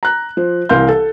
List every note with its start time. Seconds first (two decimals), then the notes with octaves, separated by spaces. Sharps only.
0.03 A#5 F#6
0.37 F3 C5
0.69 C2 E3 A#4 F5 C6 G6
0.88 A4